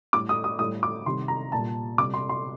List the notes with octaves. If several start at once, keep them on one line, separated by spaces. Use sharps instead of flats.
A2 G3 D6
D#6
D#6
A2 G3 D#6
D6
C3 D#3 G3 C6
A#5
A#2 G3 A5
C3 G3 D6
C6
C6